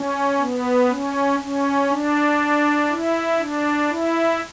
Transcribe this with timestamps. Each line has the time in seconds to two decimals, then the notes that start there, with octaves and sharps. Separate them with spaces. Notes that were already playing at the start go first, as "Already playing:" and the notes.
Already playing: C#4
0.40 B3
0.90 C#4
1.40 C#4
1.89 D4
2.89 E4
3.38 D4
3.88 E4